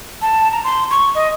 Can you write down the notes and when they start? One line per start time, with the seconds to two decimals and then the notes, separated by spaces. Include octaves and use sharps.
0.22 A5
0.52 A#5
0.64 C6
0.91 C#6
1.15 D#5